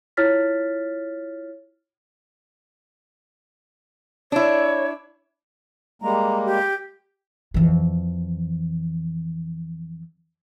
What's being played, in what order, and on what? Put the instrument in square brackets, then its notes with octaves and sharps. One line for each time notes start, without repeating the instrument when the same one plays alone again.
[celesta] E4 F4 C#5 F6 A6 B6
[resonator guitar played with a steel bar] D4 E4 [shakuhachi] C#5
[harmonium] G3 G#3 A#3 [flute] A#5
[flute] G4
[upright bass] F2 E3